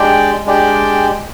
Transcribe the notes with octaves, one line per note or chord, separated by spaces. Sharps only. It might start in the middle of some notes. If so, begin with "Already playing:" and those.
Already playing: G#3 D4 G4 D5 G5
G#3 D4 G4 D5 G5